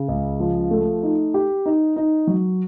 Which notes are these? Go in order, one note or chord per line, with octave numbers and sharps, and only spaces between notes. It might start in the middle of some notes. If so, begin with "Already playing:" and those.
Already playing: C#3
C#2
F3
A3
D#4
G4
D#4
D#4
F#3